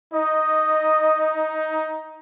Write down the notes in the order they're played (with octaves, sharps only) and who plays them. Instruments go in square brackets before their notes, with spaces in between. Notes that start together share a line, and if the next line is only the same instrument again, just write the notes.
[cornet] D#4 [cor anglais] D#5